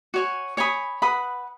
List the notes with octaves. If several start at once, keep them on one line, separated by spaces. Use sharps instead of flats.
F#4 C#5 G#5
C#5 G#5 B5 D#6
B4 F#5 B5 D#6